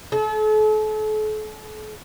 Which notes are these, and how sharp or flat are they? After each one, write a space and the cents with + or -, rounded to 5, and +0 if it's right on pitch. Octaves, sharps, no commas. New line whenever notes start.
A4 -40